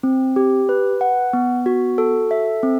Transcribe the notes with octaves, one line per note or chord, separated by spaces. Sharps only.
C4
G4
B4
F#5
B3
F#4
A4
E5
C4